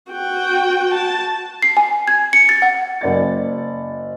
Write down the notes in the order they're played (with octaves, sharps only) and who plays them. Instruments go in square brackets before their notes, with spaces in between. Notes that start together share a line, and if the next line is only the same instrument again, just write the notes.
[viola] F#4 G5
A5
[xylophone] C7
G#5
G#6
C#7
A6
F#5
[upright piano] F#1 D5 A6